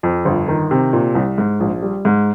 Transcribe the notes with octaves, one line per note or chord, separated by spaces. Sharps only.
F2
G1
D#3
C3
A#2
C2
G#2
A#1
G3
G#2